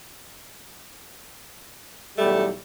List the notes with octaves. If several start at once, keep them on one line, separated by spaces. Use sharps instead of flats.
B1 E2 G3 A3